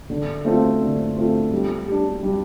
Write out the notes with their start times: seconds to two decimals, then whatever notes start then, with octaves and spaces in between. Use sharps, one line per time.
0.10 D3
0.45 A3 C4 F4
0.81 D3
1.16 A3 C4 F4
1.52 G3
1.87 D4 G4
2.23 G3